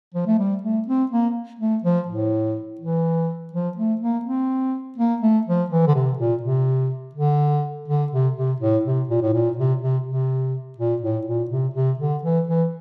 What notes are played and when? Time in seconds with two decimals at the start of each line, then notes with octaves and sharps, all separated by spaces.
0.14 F3
0.27 A3
0.39 G3
0.63 A3
0.87 C4
1.11 A#3
1.59 A3
1.83 F3
2.08 A2
2.80 E3
3.53 F3
3.77 A3
4.01 A#3
4.25 C4
4.97 A#3
5.22 A3
5.47 F3
5.70 E3
5.87 D3
5.95 C3
6.19 A#2
6.42 C3
7.15 D3
7.88 D3
8.12 C3
8.36 C3
8.60 A2
8.85 C3
9.09 A#2
9.21 A2
9.33 A#2
9.57 C3
9.81 C3
10.06 C3
10.78 A#2
11.01 A2
11.26 A#2
11.50 C3
11.74 C3
11.99 D3
12.23 E3
12.47 E3